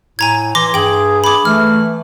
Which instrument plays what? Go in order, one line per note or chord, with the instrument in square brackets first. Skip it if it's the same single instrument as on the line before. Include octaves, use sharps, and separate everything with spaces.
[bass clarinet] A2 [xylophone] G#5 A#5 G#6
[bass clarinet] E3 [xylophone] C6 D6 A#6
[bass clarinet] G2 [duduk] G#4 [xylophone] G5 F#7
[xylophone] B5 D6
[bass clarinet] E3 [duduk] A3 [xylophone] F6